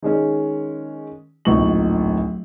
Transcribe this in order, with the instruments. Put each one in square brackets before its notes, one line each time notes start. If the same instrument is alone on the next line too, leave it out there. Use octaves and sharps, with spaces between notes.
[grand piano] D#3 G#3 C#4
D1 A#1 D#4 C#6 F#7